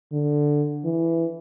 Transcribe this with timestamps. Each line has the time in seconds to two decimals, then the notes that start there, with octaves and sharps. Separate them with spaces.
0.12 D3
0.84 E3